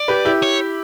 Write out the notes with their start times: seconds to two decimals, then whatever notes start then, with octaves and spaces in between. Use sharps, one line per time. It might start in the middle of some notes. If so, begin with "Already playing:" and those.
Already playing: D5
0.08 G4 B4
0.25 E4 G4
0.43 C#5